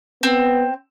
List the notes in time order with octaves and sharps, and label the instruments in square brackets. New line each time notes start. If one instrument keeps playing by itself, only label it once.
[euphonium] B3 [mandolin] C4